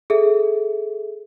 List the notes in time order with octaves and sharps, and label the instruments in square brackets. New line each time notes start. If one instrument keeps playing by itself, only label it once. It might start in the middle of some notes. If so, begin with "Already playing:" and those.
[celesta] G#4 A4 E5